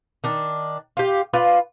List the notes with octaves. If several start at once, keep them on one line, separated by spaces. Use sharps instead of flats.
D#3 D4
F4 G4
F4 B4 D5